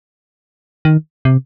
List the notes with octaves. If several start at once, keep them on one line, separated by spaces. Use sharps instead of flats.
D#3
C3